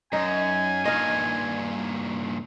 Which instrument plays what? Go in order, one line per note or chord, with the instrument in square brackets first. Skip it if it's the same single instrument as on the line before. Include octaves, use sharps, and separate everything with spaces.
[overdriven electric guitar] F#2 [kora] D#4 [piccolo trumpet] G#5
[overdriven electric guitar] G2 A#2 [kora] D#5 F5